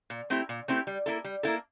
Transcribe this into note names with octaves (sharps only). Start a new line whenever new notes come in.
A#2
A3 C4 E4 G4
A#2
A3 C4 E4 G4
G3
A#3 E4 A4
G3
A#3 E4 A4